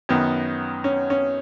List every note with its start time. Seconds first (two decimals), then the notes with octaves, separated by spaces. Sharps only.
0.09 F#2 D#3 B3
0.84 C#4
1.10 C#4